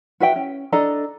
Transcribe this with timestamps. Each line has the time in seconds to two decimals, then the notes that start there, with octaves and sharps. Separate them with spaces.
0.20 F#4 B4 E5 G5
0.36 C#4
0.72 D4 A4 D#5 A#5